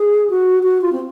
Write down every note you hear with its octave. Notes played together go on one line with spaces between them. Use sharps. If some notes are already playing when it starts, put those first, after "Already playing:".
Already playing: G#4
F#4
F#4
F4
C4